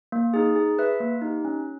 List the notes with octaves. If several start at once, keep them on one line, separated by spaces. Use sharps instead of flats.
A#3
D#4 G#4
G#4
B4 E5
A#3
D#4 G4
C#4